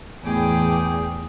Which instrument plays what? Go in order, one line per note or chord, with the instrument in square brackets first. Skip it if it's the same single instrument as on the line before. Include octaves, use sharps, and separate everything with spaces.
[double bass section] E2 [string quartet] A2 G5 D6 [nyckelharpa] G#4